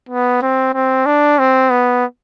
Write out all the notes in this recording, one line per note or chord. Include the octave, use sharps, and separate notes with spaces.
B3
C4
C4
D4
C4
B3